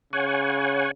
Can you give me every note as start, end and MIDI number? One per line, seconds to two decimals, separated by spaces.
0.13 0.87 49
0.13 0.91 73
0.13 0.91 78
0.13 0.91 80